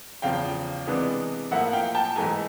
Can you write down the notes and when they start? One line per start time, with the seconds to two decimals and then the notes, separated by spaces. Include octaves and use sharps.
0.22 E2 C#3 F3 F5 G5
0.87 C3 E3 G#3 B3 D4
1.51 A2 F3 A#3 E5 F#5
1.67 F#5
1.73 F5 G5
1.95 G5 A5
2.15 G#2 E3 A3 G#5 A#5